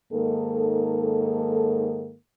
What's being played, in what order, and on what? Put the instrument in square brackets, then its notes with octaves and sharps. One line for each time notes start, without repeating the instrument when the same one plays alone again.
[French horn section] G#2 D#3 A#3 A4